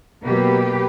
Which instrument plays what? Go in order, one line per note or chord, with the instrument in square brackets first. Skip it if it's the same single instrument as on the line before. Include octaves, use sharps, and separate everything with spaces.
[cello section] B2 F#3 A#3 G4 B4